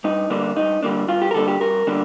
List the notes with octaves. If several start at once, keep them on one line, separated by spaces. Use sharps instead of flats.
G2 D#4
D3 G3 A#3 D4
G2 D#4
D3 G3 A#3 D4
G2 F4
G4
A#4
D3 G3 A#3 D4 A4
G4
G2 A#4
D3 G3 A#3 D4